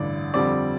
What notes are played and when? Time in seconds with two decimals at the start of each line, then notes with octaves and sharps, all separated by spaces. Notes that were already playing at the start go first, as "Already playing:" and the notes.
Already playing: A1 G2 D3 D5
0.34 F2 D3 G3 C4 D5